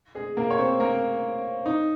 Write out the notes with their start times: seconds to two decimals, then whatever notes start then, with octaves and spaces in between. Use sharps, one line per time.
0.15 G#3 G#4
0.37 A#3 A#4
0.50 C#5
0.58 C4 C5
0.80 A#3 A#4
1.66 D#4